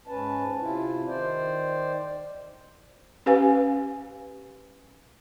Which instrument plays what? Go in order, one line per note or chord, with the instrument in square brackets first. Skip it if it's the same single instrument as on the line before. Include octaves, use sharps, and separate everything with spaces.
[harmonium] G#2 C#4 B4 A5
C3 E4 F4
D#3 C5 D5
[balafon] C#4 G4 B4 F5 G#5